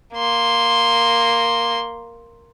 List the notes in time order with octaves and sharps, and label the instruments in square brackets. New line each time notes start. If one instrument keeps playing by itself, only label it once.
[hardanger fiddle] A#3 C6